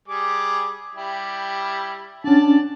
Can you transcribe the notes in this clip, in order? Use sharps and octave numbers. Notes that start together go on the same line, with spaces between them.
G3 G#4 D6
G3 E4 G4
C#4 D4 D5 F#5 A5